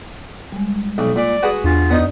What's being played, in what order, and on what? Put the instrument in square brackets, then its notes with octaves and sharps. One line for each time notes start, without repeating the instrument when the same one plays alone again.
[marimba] G3 G#3
[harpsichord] B1 D5 D6
[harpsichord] A#2 [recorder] D5
[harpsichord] F#4 G#4 B4
[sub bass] E2 [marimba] D4 G#5 [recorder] F4
[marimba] F#2 D5 [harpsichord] B3 D#4